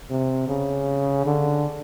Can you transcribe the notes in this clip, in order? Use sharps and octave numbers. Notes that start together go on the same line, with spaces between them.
C3
C#3
D3